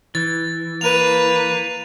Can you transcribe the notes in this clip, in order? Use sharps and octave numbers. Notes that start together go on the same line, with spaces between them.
E3 A6
A#3 B4 D#7 F7